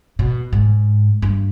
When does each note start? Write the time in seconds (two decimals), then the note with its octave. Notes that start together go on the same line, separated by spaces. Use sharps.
0.19 B2
0.53 G#2
1.22 G2